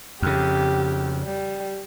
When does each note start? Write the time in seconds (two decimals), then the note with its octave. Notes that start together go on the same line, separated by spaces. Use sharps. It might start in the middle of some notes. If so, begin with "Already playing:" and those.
0.22 F2 C#3 G4
1.25 G3